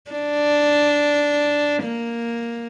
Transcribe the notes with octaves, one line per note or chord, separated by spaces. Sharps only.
D4
A#3